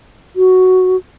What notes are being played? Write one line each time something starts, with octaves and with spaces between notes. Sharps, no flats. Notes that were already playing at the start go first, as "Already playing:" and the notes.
F#4